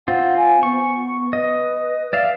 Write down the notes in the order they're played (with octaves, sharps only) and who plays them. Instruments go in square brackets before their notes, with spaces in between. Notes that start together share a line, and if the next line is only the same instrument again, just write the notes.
[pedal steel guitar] C4 F4 [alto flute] F#5
[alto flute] G#5
[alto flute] B3 [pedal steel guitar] C#6
[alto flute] B4 [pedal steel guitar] D#5
[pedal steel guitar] D5 E5 F5